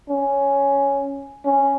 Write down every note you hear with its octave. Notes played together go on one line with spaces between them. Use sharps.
C#4
C#4